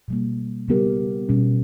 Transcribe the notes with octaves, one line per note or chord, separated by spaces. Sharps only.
B2 G3 A#3
C#3 G3 B3 G4 A#4
B2 G3 C#4